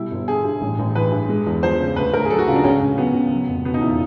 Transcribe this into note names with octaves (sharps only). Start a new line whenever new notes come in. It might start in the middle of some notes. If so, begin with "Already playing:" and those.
Already playing: B2 G3 E4
G1
D3 G#4
G2
A1
A1
E3 B4
G2
G#3
E2
F3 C5
C#3
D2 B4
D2 A#4
G#4
F#3 A4
F#4
C#3 F4
D4
C#2 C#4
C#2
F#3 B3
C#3
F#3
F1
B2 B3
D#4
E2 E4
F4